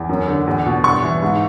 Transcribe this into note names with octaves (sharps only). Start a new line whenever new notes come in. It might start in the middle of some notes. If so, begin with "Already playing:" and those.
Already playing: E2
F#2
D3
E2
B2
G2 C#6
E3
G#2